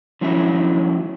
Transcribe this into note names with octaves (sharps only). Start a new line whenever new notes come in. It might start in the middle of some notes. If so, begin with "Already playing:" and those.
D#3 F3 F#3 A3 C#4 E4